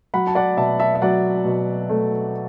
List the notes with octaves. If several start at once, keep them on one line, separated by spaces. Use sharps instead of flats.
F#3 F#5 B5
A5
D5 F#5
B2 E5 A5
E5 A5
E5
F#3 D5 F#5
B2
A3